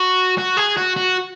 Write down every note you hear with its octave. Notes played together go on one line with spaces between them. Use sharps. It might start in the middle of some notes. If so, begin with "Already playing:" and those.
Already playing: F#4
F#4
G#4
F#4
F#4